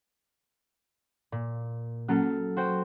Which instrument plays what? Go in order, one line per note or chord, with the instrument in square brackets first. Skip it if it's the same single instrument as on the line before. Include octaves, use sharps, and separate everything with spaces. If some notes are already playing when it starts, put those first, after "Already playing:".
[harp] A#2
[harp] F#3 A4 F6 [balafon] A#3 C#4
[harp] F#4 C5 G5